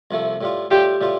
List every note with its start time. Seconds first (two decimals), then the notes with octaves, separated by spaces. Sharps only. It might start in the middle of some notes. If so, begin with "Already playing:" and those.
0.11 C2 C3 F3 A3
0.41 A2 G3 F4
0.71 A2 G3 F4 G4
1.01 A2 G3 F4